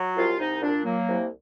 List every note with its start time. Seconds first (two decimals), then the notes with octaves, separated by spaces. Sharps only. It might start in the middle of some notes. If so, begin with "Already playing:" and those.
Already playing: F#3
0.16 C2 F4
0.39 C2 D#4
0.62 A#2 D4
0.84 F#3 A#3
1.08 C2